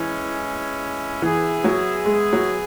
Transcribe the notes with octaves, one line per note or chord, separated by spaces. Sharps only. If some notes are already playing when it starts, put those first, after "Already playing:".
Already playing: E3 G#3 C#4 E4
E3 B3 G#4 E5
F#3
G#3
F#3